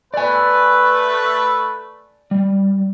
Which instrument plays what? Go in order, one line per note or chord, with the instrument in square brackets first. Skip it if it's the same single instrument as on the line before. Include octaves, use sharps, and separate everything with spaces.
[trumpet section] A3 B4 [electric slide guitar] D5 G#5
[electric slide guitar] G3